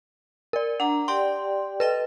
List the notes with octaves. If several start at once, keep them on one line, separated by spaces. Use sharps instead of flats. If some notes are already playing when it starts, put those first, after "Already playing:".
A#4 D5
D4 F#5 A#5
G4 D5 G5 C6
A4 B4 D#5 G5